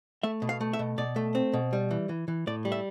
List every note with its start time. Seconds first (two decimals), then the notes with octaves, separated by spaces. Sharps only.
0.23 A3 E5
0.42 B2
0.49 F5
0.61 A3
0.73 E5
0.79 B2
0.98 B2 D5
1.16 A3
1.35 C4
1.53 B2
1.73 G3
1.91 E3
2.09 E3
2.28 E3
2.47 A2 D5
2.65 G3
2.72 E5